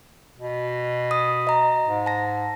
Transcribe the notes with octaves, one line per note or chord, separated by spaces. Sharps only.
B2
D#6
D#5 A#5
G#2
A5 A#6